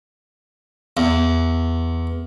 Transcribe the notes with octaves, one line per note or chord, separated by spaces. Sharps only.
E2